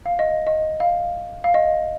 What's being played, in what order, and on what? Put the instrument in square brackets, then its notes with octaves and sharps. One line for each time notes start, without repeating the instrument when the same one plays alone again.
[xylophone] F5
D#5
D#5
F5
F5
D#5